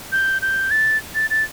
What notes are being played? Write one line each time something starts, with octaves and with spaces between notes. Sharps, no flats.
G6
G6
A6
A6
A6